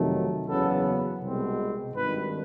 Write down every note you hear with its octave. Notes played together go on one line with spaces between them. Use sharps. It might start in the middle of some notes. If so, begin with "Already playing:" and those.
Already playing: F2 C3 D#3 F#3 A3
F#1 E2 C#3 F#3 B3 A4
C2 B2 G#3 C4
G#1 G2 D#3 B4